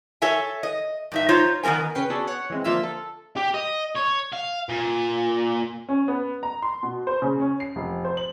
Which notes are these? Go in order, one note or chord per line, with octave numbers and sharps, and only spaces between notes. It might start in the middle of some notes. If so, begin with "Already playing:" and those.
A4 C#5 E5 G#5
D#5
G2 D#4 E5
D#4 F4 C5 C#5
D#3 B3 C4 A#4 G#5
C#3 C#4 B4 G5 C7
B3 D4 F#4 G#4 A4
C#5 F#5
E3 G#3 C4
D3 F3 A#3 F4 E5 E6
A4
G4
D#5
C#5
F5
A#2
C#4
B3
A#5
C6
B2
C5
C#3
C#4
C7
F1
C5
F#7